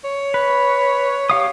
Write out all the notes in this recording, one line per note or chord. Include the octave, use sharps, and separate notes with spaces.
C#5
B4
G4 F5 D#6